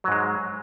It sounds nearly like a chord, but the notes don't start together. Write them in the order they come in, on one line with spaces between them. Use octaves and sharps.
F#3 G#2 G#3